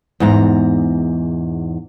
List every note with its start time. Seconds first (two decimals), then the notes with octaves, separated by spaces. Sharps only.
0.20 E2 G#2 A#5